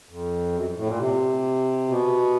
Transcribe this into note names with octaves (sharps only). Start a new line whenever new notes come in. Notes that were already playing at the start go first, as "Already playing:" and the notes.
F2
F#2
A2
A#2
C3
B2